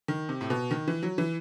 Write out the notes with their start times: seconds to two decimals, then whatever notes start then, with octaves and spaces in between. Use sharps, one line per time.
0.08 D#3
0.29 C3
0.41 A2
0.50 B2
0.71 D#3
0.88 E3
1.03 F#3
1.18 E3